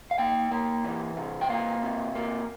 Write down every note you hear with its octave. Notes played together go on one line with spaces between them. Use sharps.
F5
A#3 G5
A#3
E3
C3
G5
A#3 F5
C3
A#3